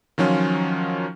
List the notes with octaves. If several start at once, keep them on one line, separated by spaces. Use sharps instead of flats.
D#3 F3 F#3 C#4 F4